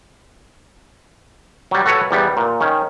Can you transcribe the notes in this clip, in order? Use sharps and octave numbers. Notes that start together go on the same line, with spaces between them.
F#3 G3
F#4 A4 B4 C#5 F#5
E2 G3 B3
A#2
D#3 C#4